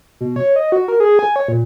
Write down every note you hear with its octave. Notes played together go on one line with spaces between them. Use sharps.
B2
C#5
D#5
F#4
A#4
G#4
G#5
C#5
A#2